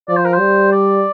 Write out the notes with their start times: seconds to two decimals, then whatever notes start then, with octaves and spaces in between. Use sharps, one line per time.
0.08 F3 D5
0.17 C5
0.25 A#4
0.33 C5
0.40 G3
0.72 D5